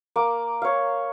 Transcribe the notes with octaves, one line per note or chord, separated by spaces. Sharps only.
A#3 D6
C#5 F5